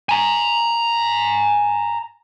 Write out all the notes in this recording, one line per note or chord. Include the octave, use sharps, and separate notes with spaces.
G#5 A#5